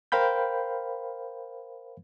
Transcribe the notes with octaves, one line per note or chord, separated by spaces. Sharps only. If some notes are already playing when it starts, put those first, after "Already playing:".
A#4 C5 F5 G5 B5 G6